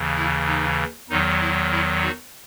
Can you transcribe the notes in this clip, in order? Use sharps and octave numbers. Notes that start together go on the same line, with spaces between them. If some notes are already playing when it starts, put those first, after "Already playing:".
Already playing: D#2 C#3 E3
E4
D#4
E2 D#3 F#3 D#4
E4
E4
D#4 F#4